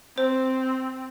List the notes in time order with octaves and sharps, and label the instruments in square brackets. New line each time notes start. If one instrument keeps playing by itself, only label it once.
[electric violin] C4 [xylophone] C5